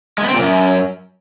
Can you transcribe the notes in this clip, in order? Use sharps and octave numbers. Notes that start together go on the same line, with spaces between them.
G#3
B3
C4
A#2
F#2